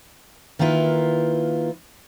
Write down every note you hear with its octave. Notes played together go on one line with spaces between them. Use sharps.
D#3 A#3 E4 F4 B4